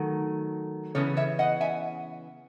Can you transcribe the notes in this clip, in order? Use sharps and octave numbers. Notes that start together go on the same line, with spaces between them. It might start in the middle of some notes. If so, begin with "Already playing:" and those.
Already playing: D#3 F#3 A3
C#3 E3 B3 A4 C#5
C#5 E5
D#5 F#5
E5 G#5